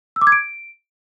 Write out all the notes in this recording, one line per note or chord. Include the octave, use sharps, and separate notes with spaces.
E6
D6
G#6
D7